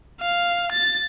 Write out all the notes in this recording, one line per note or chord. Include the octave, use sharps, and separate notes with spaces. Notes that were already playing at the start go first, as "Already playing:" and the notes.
F5
A6